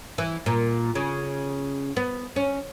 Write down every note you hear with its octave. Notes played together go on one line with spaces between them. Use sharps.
E3
A#2
C#3
B3
C#4